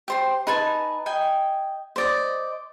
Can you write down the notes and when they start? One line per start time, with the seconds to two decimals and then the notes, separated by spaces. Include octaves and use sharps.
0.08 G4 C5 C6
0.47 D#4 B4 G#5 A5
1.06 D#5 G5 G#5
1.96 C5 D5 D#5